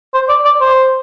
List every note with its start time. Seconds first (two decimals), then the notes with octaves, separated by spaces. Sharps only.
0.14 C5
0.29 D5
0.45 D5
0.61 C5